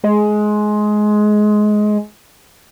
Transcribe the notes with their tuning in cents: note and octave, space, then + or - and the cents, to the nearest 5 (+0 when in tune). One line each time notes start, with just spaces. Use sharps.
G#3 +20